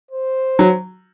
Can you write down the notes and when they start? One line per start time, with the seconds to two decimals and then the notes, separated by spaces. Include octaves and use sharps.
0.11 C5
0.59 F#3